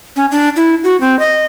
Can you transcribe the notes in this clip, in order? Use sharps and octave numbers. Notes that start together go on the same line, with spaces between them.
C#4
D4
E4
F#4
C4
D#5